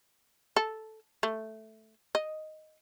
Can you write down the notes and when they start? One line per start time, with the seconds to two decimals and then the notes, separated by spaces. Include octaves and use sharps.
0.56 A4
1.23 A3
2.15 D#5